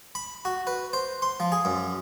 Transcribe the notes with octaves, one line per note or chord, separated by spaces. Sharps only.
B5
F#4
B4
C5
C6
F3
G#4
F#2